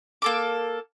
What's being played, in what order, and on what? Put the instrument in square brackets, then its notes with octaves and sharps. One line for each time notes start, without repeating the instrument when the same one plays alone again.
[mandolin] A#3 A4 D6